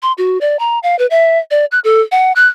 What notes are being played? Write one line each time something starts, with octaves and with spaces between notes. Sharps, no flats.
C6
F#4
D5
A#5
F5
B4
E5
D5
F#6
A4
F#5
F#6